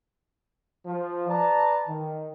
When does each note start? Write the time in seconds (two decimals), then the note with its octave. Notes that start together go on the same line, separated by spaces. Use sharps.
0.86 F3
1.28 B4 D5 A5 A#5
1.88 D#3